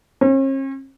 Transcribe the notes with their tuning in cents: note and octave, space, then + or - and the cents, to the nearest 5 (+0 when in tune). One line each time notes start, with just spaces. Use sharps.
C#4 -45